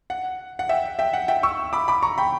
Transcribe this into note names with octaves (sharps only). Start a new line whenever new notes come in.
F#5
F#5
E5 G5
E5 G5
F#5
E5 G5
C#6 E6
B5 D6
B5 D6
A#5 C#6
G5 B5